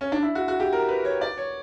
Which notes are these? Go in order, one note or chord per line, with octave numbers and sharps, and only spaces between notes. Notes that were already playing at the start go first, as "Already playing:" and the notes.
C#4
D4
E4
F#4
F#4
G4
A#4
B4
C#5
D5
C#5